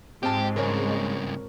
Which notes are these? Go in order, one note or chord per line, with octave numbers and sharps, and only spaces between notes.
G#2 G#3 C4 F4 G4 A5
G2 C#3 A#4 C#5